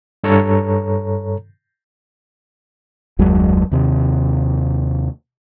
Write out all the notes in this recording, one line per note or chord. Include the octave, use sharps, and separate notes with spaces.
G2 A4 C#5 A#5
F#1 D#2 F#3 G#3
D#2 C3